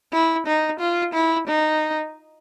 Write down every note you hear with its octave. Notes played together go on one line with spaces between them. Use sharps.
E4
D#4
F4
E4
D#4